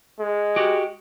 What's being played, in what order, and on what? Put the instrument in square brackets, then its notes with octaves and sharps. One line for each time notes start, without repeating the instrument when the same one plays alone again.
[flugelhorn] G#3
[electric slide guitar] F#4 G4